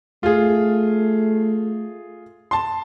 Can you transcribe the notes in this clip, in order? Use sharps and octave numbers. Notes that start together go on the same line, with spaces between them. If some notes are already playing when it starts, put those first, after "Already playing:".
A3 F4 G#4
A5 C6